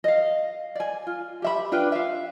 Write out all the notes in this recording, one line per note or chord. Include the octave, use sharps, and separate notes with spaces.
D#5 F5
D5 G#5
F4
G4 E5 B5
D4 F4 B4 G5
E5 F5